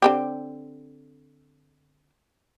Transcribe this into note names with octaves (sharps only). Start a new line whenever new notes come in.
D3 C4 G4